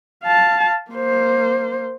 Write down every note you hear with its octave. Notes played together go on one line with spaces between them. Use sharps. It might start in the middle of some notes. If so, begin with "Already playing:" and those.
F5 A5
A#3 C5